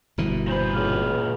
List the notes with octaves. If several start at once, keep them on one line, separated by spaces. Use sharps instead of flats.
G1 B2 E3
A#2 B4 C5
C#2 A#3 F6